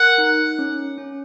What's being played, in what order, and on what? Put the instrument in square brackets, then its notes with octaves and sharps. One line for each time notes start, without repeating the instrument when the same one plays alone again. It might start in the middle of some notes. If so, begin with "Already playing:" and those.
Already playing: [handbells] A#4 [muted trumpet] F#5
[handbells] D#4
C#4
C#4